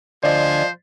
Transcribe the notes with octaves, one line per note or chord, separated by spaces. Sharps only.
D2 D3 F3 C5 D5 D#5 G#5